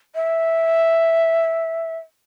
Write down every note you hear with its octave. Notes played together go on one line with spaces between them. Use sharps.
E5